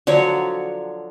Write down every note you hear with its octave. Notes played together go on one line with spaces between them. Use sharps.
D3 F3 F#3 C#5